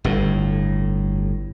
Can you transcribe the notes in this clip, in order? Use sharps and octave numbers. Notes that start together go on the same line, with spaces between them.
G1 A2